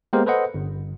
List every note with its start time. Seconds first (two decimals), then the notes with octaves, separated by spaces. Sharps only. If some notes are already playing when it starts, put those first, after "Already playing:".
0.13 G#3 A#3 B3 G4 A#4 C5
0.26 A4 B4 C5 D#5 F#5
0.54 G1